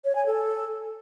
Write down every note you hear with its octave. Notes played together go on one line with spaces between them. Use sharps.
C#5
G#5
A4